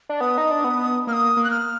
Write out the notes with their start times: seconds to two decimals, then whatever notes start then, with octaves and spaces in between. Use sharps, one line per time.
0.09 D4
0.20 B3 D#6
0.38 D#4
0.51 D4
0.64 B3
1.07 A#3 F6
1.13 D#6
1.37 A#3
1.44 F#6
1.51 F6